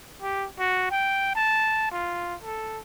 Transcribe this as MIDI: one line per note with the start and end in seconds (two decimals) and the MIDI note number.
0.22 0.47 67
0.59 0.86 66
0.91 1.32 79
1.35 1.89 81
1.91 2.35 65
2.44 2.79 69